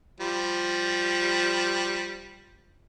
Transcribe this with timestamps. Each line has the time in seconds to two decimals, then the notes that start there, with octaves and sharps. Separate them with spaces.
0.20 F3 G3